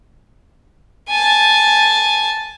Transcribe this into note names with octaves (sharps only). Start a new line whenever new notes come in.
G#5 A5